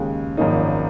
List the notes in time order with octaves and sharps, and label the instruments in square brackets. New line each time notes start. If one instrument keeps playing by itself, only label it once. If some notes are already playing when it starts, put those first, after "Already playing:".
Already playing: [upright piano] D#2 C#3 G#3
G#1 F#2 F3 A#3 D#4